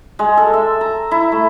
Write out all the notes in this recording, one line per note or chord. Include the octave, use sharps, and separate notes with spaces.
G#3
A4
E5
A#5
E4
A3